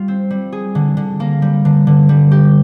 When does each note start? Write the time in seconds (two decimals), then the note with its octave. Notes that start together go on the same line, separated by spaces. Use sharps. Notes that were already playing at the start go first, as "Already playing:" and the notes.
Already playing: G3 F4
0.08 C4
0.31 G3
0.52 G#4
0.75 D3
0.97 D3
1.20 A#3
1.42 G3
1.65 D3
1.87 D3
2.09 G3
2.31 G4